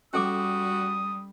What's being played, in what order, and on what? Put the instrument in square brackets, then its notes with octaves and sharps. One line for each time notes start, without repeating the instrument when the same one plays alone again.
[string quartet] G3 [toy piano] C#4 A4 D6 [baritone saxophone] F#4 [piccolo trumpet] D#6